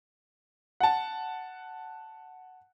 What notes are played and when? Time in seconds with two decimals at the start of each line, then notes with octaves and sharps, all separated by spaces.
0.80 F#5 A5